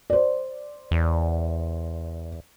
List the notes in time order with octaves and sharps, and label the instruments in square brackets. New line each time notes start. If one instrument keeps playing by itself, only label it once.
[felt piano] C5 D5
[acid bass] E2